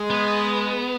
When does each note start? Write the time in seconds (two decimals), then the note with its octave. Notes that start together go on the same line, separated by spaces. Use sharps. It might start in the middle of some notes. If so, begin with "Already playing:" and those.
Already playing: G#3
0.10 B3